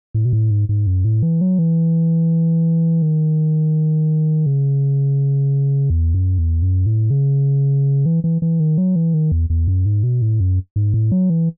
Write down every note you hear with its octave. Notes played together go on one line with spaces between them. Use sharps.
A2
B2
A2
G#2
G#2
F#2
A2
E3
F#3
E3
D#3
C#3
E2
F#2
E2
F#2
A2
C#3
E3
E3
E3
D#3
F#3
E3
D#3
E2
E2
F#2
G#2
B2
A2
F#2
G#2
A2
F#3
E3